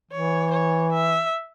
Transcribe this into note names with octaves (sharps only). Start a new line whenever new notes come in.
E3 C#5
C#5
E5